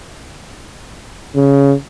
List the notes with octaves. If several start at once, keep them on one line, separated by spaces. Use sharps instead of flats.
C#3